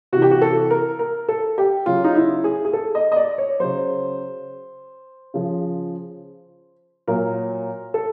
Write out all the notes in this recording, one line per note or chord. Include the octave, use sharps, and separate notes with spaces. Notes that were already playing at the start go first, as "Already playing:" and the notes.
C3 E3 F#4
G4
F#4
A4
A#4
A#4
A4
G4
C#3 F#3 F4
D#4
E4
G#4
G#4
A4
D#5
D#5
D5
C#5
C#3 F#3 C5
C#3 F3
A#2 F#3 A#4
A4